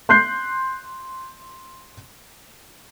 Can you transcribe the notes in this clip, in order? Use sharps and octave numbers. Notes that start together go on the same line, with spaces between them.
C6 F#6 G6 C7